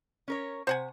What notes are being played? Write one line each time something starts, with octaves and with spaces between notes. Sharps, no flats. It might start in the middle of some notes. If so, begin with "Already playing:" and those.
C#4 A#4 C#5
C3 C5 F#5 G#5